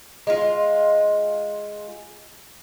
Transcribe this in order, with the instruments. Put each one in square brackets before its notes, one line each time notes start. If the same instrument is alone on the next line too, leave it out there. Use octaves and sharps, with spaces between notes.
[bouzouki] G#3 F4